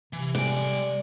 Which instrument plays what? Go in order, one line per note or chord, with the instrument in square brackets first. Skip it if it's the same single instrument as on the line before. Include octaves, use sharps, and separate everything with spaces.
[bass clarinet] C3 [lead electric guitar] E3
[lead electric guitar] G3 G#5 [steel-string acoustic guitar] D5